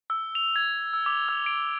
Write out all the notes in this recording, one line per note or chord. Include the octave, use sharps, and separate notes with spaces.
E6
F7
G#6
E6
D6
E6
D7